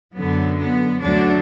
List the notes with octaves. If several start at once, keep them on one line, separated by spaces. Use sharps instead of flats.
F#2 D3 F#3 B3
B3
D2 D3 F#3 D4